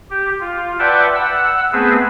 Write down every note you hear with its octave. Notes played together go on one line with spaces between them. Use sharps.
G4
F4
B4 D5 E5 F#5 G5 A5
F#5 E6
A3 B3 C4 G#4 B4